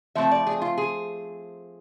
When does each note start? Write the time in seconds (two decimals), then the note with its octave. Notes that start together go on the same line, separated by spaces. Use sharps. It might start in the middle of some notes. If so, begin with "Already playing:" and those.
0.15 F3 A3 C4 E5
0.31 D5
0.47 G#4
0.62 F4
0.78 G#4